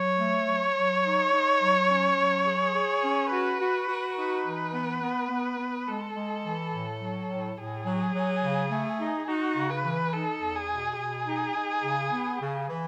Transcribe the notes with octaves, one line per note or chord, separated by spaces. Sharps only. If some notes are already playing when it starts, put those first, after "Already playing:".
Already playing: F#3 C#5
A3
F#3
F#3
D#4
D#4
F#3
C#4
F#3
G#4
G#4
C#4
F#4 B4
F#4
F#4
D#4 B4
E3
B3
B3
B3
B3
G#3 A4
G#3
E3
A2
F#3
A2
A2 G#4
F#3
F#3
C#3
A3
D#4
D#4 F#4
C#3
B4
E3
D#4 A4
E2
G#4
B2
B2 G#4
D#4
D#4
C#3
B3
C#3
E3